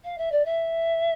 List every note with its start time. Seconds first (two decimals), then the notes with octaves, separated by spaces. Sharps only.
0.04 F5
0.18 E5
0.32 D5
0.45 E5